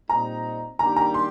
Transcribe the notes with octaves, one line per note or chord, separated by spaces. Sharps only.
A#2 G3 C4 D#4 A#5
G2 D#3 G3 A#3 G4 A#5
A#5
C6